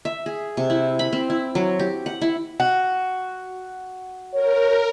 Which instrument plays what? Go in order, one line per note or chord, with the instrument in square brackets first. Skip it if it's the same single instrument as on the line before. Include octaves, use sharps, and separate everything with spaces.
[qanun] E5
G#4
C3
E4
B5
C4
E4
F#3
G4
F#5
E4
[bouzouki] F#4
[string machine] A#4 [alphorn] C#5